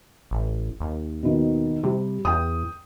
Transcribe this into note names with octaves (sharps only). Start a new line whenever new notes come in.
A1
D#2
B2 D#3
C3 G3
E2 G5 D#6